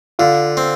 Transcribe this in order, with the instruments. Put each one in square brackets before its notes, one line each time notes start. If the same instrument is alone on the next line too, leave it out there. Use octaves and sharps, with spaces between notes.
[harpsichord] D3 [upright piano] F4
[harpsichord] C4